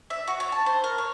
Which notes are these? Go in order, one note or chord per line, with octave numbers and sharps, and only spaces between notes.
E5
F#4
C#5
A5
C5
A#4
C#5